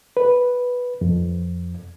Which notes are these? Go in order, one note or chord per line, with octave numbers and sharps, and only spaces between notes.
B4
F2